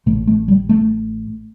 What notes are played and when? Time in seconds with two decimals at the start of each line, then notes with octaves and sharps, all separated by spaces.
0.06 A1 A2 A3
0.27 A3
0.48 G3
0.69 A3